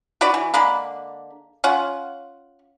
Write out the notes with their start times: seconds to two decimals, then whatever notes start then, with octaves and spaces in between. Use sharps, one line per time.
0.21 D4 F#4 B4 D5
0.34 E3
0.54 D3 G#3 A#3 B5
1.64 C#4 F4 F#5